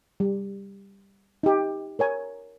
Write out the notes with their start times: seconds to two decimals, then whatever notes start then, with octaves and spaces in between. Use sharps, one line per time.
0.20 G3
1.43 D#4 G4
1.99 A#4 C#5 G#5